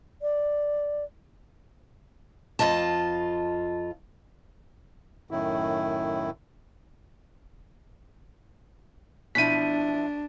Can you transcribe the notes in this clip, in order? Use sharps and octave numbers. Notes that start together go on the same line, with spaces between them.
D5
F2 G#2 F4 D#5 A5
F#2 A2 D#3 E4
B2 F3 D4 E4 B6 D#7